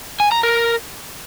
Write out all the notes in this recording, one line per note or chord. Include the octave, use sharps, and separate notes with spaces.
G#5
A#5
A#4